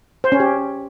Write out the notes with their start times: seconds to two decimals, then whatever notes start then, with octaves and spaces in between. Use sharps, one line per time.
0.24 C5
0.32 C#4
0.40 G4